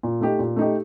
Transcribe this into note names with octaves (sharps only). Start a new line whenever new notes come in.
A#2
A3 D#4 G4
A#2
A3 D#4 G4